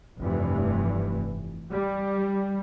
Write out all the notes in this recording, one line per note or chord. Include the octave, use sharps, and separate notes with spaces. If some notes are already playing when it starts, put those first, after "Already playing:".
F1 G2 E3
G3